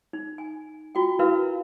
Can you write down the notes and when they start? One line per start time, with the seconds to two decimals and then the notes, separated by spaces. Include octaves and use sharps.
0.13 D#4
0.38 G#5
0.95 F4 F#4 G5
1.19 E4 F#4 A#4 B4 F5